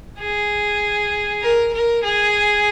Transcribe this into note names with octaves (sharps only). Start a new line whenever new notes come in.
G#4
A#4
A#4
G#4